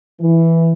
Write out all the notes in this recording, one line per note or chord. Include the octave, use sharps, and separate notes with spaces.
E3